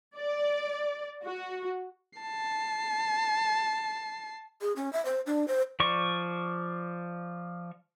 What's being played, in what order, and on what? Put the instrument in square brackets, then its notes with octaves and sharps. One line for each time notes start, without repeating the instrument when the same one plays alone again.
[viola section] D5
F#4
[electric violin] A5 C7
[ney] G#4
C#4
E5
C5
D4
C5
[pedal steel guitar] F3 D5 C#6